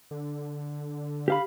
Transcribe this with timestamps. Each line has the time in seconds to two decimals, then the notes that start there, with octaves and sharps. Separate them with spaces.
0.11 D3
1.28 G4 F5 B5